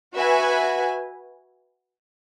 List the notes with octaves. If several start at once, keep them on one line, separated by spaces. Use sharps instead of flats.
F#4 B4 E5 G#5